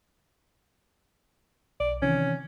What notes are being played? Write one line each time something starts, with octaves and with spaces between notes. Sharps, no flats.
B1 D5
C3 D#3 E3 C#4